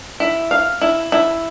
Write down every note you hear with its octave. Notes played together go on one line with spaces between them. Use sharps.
E4
F5
E4
E4